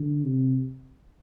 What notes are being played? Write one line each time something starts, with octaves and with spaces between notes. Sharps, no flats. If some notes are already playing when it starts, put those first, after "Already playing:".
Already playing: D3
C3